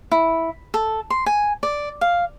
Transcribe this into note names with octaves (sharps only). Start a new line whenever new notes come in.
E4
A4
C6
G#5
D5
F5